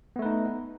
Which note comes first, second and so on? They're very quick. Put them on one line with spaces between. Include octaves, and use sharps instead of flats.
B3 A3 B4 D#4